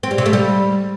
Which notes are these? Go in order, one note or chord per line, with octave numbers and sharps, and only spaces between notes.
C4
G3
C3
A3
G3